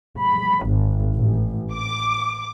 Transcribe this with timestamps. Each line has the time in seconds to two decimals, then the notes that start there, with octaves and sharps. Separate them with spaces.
0.19 B5
0.67 G#1
1.15 A1
1.74 D6